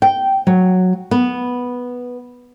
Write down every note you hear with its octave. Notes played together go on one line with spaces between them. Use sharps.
G5
F#3
B3